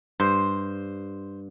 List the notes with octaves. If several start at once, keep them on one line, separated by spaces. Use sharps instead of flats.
G2 C5